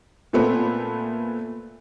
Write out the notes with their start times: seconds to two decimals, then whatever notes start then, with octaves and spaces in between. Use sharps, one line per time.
0.33 A#2 A3 B3 C4